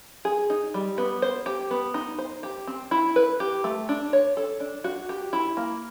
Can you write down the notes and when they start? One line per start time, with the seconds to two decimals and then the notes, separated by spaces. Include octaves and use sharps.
0.25 G#4
0.50 D#4
0.74 G3
0.98 B3
1.22 C5
1.46 G4
1.71 B3
1.94 D#4
2.19 C5
2.43 G4
2.67 C4
2.91 E4
3.16 B4
3.40 G4
3.64 A3
3.89 D4
4.13 C#5
4.37 A4
4.60 D4
4.84 F#4
5.09 G4
5.33 E4
5.57 A#3